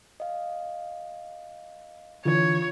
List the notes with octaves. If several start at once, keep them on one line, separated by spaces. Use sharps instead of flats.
D#5 F5
D3 E3 F4 C#5